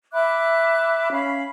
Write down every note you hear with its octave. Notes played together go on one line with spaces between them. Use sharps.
E5 B5 D6 F#6
C#4 F5 B5